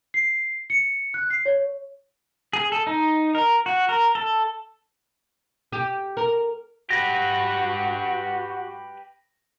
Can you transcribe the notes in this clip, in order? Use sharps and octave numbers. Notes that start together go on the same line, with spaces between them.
C7
C#7
F#6
C7
C#5
G#4
A4
D#4
A#4
F#4
A#4
A4
G4
A#4
F#4 G4 B4 A#6